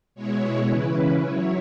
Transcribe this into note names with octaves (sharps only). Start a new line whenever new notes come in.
B2 G#3 E4 C#5
C#3 E3 C#4 E4 B4
F#3 E4 C#5